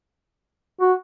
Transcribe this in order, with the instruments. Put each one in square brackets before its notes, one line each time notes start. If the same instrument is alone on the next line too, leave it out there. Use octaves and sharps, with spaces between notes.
[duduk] F#4